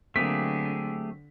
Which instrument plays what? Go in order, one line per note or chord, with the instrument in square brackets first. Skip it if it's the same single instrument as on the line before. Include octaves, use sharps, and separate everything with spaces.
[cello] D3 [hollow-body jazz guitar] F#3 A#3 C4 [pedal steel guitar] A3 G4 G#4 [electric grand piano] B6